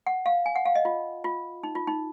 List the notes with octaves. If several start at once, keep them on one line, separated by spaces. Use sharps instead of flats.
F#5
F5
G#5
F#5
F5
D#5
F4
F4
D#4
F4
D#4